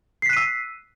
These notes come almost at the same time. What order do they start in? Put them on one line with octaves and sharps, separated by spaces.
C7 B6 F#6 D#7 E6